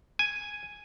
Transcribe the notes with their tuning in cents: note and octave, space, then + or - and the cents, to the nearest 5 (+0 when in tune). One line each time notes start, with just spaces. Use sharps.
G#5 +0